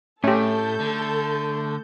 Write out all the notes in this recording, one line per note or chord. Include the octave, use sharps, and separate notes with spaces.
A2 A3 C#4 G4 A4 G6
D3